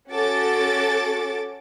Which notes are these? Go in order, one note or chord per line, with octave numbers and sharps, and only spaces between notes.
C#4 F#4 A4 D6 A6